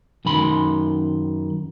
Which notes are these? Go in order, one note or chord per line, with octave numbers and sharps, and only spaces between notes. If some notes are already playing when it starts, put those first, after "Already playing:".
F#2 D#3 B5 C6